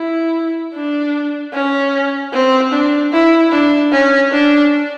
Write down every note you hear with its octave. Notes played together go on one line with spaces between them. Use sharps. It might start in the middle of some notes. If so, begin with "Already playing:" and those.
Already playing: E4
D4
C#4
C4
D4
E4
D4
C#4
D4